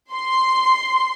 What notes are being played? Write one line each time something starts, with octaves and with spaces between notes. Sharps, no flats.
C6